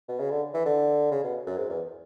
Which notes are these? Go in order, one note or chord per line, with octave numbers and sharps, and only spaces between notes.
B2
C#3
D3
E3
D3
C#3
B2
F#2
G#2
E2